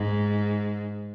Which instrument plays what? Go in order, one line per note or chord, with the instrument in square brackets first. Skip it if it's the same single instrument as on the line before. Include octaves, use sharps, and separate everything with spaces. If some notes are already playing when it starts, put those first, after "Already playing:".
Already playing: [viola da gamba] G#2